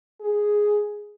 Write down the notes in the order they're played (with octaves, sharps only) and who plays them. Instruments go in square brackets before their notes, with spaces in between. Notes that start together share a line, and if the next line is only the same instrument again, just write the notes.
[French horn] G#4